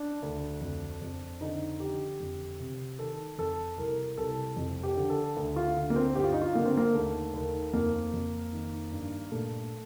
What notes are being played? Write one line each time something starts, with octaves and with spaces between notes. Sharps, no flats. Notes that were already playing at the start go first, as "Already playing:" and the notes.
Already playing: D4
D2
F2
F2
D3 D#4
D3 G4
F2
C3
D#3 A4
F2 A4
C2 A#4
C2 A4
F2
G4
D3
A4
D2
F4
D3
A#3
C4
G2 G4
F4
D#4
F4
D3 A#3
C4
A#3
D#2 A3
D#2
F2 A#3
F2
D#3
G2
A#2 A3